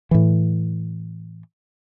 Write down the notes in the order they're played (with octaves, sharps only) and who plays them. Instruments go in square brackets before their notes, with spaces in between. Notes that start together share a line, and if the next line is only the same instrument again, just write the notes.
[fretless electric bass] A2 E3